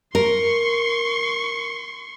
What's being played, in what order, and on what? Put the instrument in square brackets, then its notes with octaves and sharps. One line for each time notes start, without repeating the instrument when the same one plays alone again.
[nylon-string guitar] A#4 [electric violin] C6 C#6